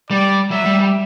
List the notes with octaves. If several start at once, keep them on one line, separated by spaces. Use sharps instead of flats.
G3 D5
F#3 E5
G3
G3